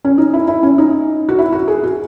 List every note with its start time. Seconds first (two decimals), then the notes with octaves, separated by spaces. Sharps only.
0.05 C#4
0.18 D#4
0.33 E4
0.48 E4
0.63 C#4
0.78 D#4
1.29 F#4
1.39 E4
1.53 F#4
1.68 G#4
1.83 F#4